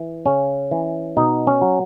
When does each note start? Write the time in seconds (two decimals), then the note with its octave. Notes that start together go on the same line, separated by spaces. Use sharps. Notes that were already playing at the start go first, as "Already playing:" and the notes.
Already playing: E3
0.26 C#3 C#4
0.71 E3
1.17 B2 D#4
1.47 C#4
1.62 F#3